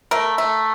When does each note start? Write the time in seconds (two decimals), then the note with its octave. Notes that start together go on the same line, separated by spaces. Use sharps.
0.11 A3 A#4
0.38 A3